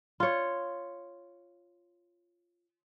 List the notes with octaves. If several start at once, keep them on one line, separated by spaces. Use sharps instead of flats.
F4 C#5